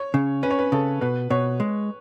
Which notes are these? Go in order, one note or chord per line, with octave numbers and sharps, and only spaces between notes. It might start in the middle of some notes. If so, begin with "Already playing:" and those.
Already playing: C#5
C#3
C#4 B4
C#5
B4
C#3 A4
B2 B4
B2 C#5
G#3